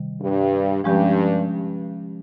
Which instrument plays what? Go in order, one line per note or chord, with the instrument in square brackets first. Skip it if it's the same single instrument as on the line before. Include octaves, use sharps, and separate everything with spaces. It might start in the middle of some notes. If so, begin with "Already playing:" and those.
Already playing: [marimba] C3 D#3 G3
[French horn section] G2
[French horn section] G2 [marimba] F3 G#3 C#4 G4